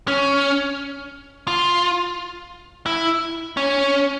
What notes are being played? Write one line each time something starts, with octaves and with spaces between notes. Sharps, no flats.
C#4
F4
E4
C#4